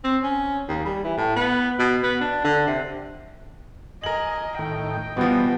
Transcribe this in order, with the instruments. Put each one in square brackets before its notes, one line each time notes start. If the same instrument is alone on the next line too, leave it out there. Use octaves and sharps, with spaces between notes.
[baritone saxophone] C4
C#4
D#2
G3
E3
A2
B3
B2
B3
D4
D3
C3
[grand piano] A#4 F#7 [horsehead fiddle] D#5 [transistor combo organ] G#5
[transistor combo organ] A2 D#3 [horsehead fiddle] D#5 G5
[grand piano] B2 E3 F3 [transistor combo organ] G3 [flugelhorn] B3